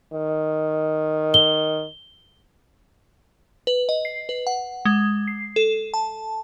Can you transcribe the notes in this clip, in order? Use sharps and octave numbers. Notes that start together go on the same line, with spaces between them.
D#3
G7
B4
D#5
C7
B4
F#5
G#3
C7
A4
A5